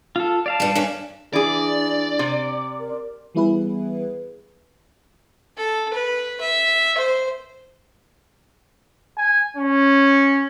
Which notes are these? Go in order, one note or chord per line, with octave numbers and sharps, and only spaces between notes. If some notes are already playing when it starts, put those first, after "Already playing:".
F4 A4
D5 F5 A5
G2 G3
G2 C#4
E3 D4 G#4 D5
C3
A#4
E3 G3 B3 E4 G#4 B4
A4
B4
E5
C5
G#5
C#4